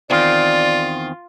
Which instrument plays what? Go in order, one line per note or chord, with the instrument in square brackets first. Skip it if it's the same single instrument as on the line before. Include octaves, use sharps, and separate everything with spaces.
[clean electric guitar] E2 D#3 C4 [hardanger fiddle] F4 [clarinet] D5